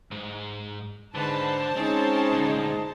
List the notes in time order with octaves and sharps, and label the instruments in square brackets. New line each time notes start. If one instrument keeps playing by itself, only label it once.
[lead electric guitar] G#2 G#3
[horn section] G#2 B4 [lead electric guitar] D3 [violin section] C5 A5
[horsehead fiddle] G#3 D#4 [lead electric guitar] C4 [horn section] C#4
[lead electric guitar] D2 A#2